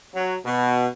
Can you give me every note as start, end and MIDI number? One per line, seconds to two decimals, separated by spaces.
0.14 0.37 54
0.44 0.87 47